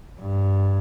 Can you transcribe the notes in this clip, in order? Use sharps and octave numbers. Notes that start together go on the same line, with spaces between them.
G2